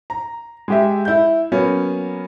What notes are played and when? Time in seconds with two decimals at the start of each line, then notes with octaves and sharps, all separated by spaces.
0.10 A#5
0.68 G#3 G4 E5
1.05 E4 G6
1.52 F#3 A#3 B3 C#4